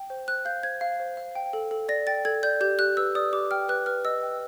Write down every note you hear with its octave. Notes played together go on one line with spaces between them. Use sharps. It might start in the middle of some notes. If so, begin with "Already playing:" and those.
Already playing: G5
C5
C5 F#6
F5 G6
C5 G#6
F5
C5
F5
G5
A4
A4
D5 A#6
G5 A6
A4 G#6
D5 G6
G4 G6
G4 F#6
B4 E6
D5 D#6
G4 D6
G5 F6
B4 F#6
B4 F6
D#5 E6
G5